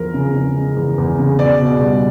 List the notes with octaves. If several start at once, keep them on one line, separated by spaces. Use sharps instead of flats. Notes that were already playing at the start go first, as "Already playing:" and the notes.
Already playing: E2 F3 A#4
C#3
C#3
G#3
E2
E2
C#3
B2 D5
B2
G3